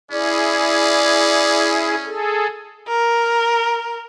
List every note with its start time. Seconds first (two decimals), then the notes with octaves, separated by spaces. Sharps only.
0.11 C#4 E4 G#4 D5
2.06 G#4 A4
2.88 A#4